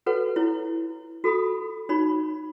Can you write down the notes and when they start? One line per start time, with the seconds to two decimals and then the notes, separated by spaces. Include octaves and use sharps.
0.06 F#4 A4 B4 C#5 F#5
0.36 E4 C#5
1.24 F#4 A4 B5 D#6
1.89 D#4 F#4 C#5 B5